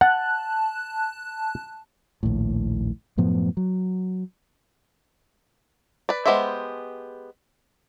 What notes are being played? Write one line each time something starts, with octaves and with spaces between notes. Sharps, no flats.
F#5 A5 F#6
A#1 D#2 A2
F#2 A2 F3 B3
F#3
B4 D5
G#3 B3 G4 C5 E5